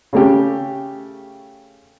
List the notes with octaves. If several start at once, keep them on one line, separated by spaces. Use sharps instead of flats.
C#3 A3 G4